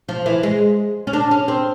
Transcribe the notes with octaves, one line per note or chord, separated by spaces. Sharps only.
F3
E3
G#3
C#4
D4
C#4
C4